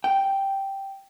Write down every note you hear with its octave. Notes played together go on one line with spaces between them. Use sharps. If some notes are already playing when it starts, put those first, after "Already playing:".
G5